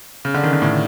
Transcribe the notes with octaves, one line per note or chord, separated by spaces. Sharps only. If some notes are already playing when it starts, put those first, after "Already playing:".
C#3
D3
D#3
D3
A2